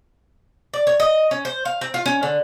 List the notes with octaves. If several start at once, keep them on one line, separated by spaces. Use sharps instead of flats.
D5
C#5
D#5
C#4
C5
F5
C4
F4
C#4
D3